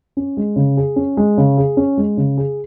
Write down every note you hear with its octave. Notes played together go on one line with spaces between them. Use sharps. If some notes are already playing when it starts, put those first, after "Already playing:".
C#4
G#3
C#3
G#4
C#4
G#3
C#3
G#4
C#4
G#3
C#3
G#4